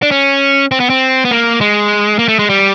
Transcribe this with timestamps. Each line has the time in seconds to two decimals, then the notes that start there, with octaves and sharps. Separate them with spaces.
0.02 D4
0.11 C#4
0.71 C4
0.80 B3
0.90 C4
1.25 B3
1.31 A#3
1.61 G#3
2.19 A#3
2.28 A3
2.39 G#3
2.50 G3